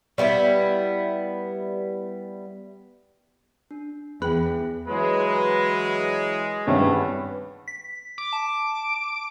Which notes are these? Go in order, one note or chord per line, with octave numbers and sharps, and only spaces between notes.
G3 B3 D#4 E4
D4
E2 B3 G#4 G5
E3 F#3 G#3 B4
G#1 E2 G2 D3 A3 C#4 B4
B6
D6
A5